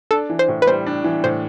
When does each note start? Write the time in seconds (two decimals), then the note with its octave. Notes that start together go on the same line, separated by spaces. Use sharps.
0.11 D4 A4
0.30 E3
0.39 C5
0.48 A2
0.62 B4
0.67 G3 C5
0.86 D4
1.04 E3
1.24 A2 C5